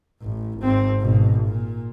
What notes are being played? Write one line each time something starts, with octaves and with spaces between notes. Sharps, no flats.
A1
G#1 C4
G#1 B2
A#2